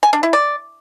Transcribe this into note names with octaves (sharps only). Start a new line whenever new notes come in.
G#5
D4
E4
D5